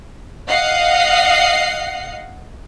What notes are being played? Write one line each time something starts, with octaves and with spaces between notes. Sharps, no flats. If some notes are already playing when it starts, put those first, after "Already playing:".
D#5 F5 F#5 C7